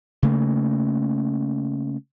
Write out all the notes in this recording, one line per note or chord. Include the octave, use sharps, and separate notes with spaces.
C#3 A3 A#3